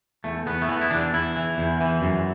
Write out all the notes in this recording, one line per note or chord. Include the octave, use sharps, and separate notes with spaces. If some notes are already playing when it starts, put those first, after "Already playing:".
E2 A3
E2 B3
A3
E3 B3
E4
E2 D4
E2 E4
E3
E2
E3
F#2